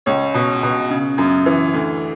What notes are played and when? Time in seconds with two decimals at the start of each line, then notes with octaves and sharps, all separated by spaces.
0.06 C#2 C#5
0.34 B2
0.63 B2
0.90 C#3
1.18 F#2
1.46 E3
1.74 D2